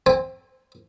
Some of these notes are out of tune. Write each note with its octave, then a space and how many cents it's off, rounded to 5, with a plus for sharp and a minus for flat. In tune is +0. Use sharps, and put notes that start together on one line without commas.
C4 +0 G#5 -30